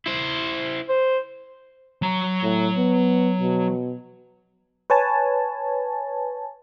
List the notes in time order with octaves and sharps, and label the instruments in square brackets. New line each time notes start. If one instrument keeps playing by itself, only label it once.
[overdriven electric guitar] E4 C5
[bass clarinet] C5
[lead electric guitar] F#3 A#5
[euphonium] A2
B3
B2
[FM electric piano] B4 C#5 G#5 A5